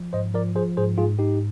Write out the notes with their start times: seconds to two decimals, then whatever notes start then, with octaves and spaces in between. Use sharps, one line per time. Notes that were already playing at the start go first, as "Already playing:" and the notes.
Already playing: F3
0.13 G#2 C5 D#5
0.34 F3 A#4 D5
0.55 F3 G#4 C5
0.77 G#2 G#4 C5
0.98 G#2 F4 G#4
1.19 G#2 D#4 G4